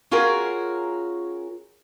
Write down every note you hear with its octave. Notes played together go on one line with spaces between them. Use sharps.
C#4 F4 F#4 G#4 A#4